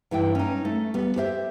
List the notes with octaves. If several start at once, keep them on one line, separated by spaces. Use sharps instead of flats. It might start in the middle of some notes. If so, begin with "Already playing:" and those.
G2 E3 E4 G5
C#4 D#4
A3
G3 B3
G4 C5 E5